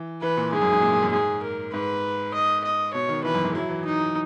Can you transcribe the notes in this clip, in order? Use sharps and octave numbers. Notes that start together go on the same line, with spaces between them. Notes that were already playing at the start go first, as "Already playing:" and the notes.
Already playing: E3
E3 B4
A#2
G#2 G#4
F#2
G#2
A#2
G#2
F#2
G#2 G#4
A#4
G#2 B4
D#5
D#5
B2 C#5
D#3
E3 B4
F#2
G#2
F#3 E4
E3
D#4